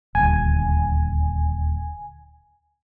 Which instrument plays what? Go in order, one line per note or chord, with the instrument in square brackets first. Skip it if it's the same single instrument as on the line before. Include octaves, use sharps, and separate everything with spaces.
[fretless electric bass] D#1 D2 [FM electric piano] G#5